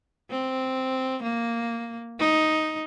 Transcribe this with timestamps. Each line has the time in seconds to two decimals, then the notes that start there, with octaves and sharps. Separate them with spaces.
0.31 C4
1.23 A#3
2.19 D#4